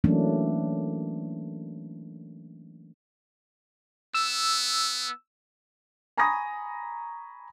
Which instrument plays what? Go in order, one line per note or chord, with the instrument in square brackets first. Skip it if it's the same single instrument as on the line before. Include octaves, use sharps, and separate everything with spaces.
[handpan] E3 F#3 A3 A#3 C#4 D4
[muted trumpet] B3 [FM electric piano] E6
[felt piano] G#5 A#5 B5 C#6 D#6 A#6